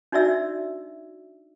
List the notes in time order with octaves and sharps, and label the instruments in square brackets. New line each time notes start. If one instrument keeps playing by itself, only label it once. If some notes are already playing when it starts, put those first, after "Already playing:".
[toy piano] D4 D#4 F#4 D5 E5 E6